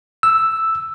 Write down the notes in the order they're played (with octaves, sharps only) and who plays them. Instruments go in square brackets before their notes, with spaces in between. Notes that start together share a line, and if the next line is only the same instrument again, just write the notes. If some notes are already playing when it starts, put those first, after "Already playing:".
[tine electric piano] E6